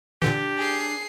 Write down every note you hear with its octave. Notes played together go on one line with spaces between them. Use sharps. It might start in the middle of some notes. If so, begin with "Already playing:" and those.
A#2 D3 E3 D4 G4
G#4 C7